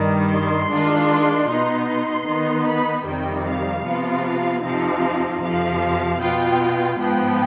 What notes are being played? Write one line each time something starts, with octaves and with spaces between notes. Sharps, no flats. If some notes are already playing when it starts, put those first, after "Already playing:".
Already playing: G2 D#3 G3
C6
D#3 G#3 D4 F4
B2 B3 D#4
C6
D#3 B3 D#4
B5
F2 C3 D#3 G3 G5
F5
C3 F3 B3 F4
F5
F2 C3 F3 C4 D#4 F5
F2 C3 F3 F5
B2 B3 F4 G5
G#2 F3 B3 G5